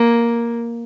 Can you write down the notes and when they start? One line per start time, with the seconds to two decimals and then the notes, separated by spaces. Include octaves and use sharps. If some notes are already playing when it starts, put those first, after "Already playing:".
Already playing: A#3